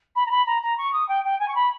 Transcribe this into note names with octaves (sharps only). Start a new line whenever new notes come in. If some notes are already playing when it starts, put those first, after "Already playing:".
B5
A#5
B5
A#5
A#5
C#6
D#6
G5
G5
G#5
C#6
B5